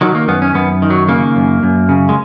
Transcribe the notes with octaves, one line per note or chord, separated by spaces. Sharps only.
D#3 F#3
A#3
F#2 B3
C#4
F#2 B3
D#3
F#3
C#3 A#3
F#2
F#2
C#3
G#3